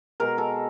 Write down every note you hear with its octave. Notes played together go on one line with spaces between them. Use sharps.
B2 G#3 A#4
A4